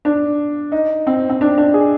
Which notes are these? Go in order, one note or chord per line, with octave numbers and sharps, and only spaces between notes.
D4
D#4
C4
C4
D4
D4
G#4